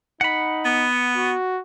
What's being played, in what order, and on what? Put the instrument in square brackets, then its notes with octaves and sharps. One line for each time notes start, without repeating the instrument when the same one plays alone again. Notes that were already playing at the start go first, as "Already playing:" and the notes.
[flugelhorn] D#4 [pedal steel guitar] F#5 B5
[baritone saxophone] B3
[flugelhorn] F#4